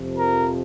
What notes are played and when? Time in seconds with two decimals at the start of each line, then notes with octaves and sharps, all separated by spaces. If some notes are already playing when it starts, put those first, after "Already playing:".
Already playing: F2 C3 F3
0.16 A#4